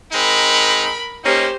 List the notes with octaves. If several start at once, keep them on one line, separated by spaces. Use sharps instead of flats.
G#3 C4 D#4 A#4 B5
A#3 C#4 D#4 G4 C5